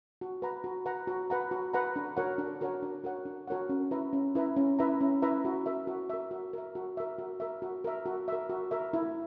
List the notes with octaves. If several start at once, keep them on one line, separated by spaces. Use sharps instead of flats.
F#4
B4 F#5 A#5
F#4
B4 F#5 A#5
F#4
B4 F#5 A#5
F#4
B4 F#5 A#5
D4
F#4 A#4 C#5 F#5
D4
F#4 A#4 C#5 F#5
D4
F#4 A#4 C#5 F#5
D4
F#4 A#4 C#5 F#5
C#4
E4 B4 E5 A#5
C#4
E4 B4 E5 A#5
C#4
E4 B4 E5 A#5
C#4
E4 B4 E5 A#5
F#4
A#4 E5
F#4
A#4 E5
F#4
A#4 E5
F#4
A#4 E5
F#4
A#4 E5
F#4
A#4 E5
F#4
A#4 E5
F#4
A#4 E5
E4